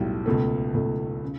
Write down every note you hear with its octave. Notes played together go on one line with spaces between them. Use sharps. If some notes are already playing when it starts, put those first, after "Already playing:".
Already playing: B1 A2 G3
C#2 B2 A3
C#2 B2 A3
C#3